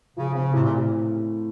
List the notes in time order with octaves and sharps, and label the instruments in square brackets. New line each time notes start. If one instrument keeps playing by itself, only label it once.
[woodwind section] C#3 [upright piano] F3
[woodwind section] C#3 [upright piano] C4
[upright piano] A2 [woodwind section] C3
[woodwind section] A#2